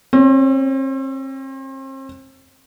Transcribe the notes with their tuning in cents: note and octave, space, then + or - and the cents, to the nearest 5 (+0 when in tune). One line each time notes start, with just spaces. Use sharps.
C4 +40 C#5 +15